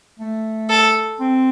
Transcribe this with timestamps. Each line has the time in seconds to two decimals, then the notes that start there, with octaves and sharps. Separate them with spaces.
0.19 A3
0.70 A4
1.20 C4